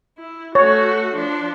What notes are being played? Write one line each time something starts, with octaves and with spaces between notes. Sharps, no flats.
E4
A3 F#4 C#5
F3 D4